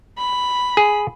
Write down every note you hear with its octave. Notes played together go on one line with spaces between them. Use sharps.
B5
G#4